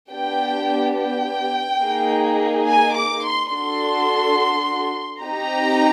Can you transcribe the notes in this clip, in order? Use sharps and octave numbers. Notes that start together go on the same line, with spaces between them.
B3 D4 G4 G5
G5
A#3 D#4 G#4
G#5
D6
C6
D4 F#4 A4 C6
C4 D#4 G4 A#5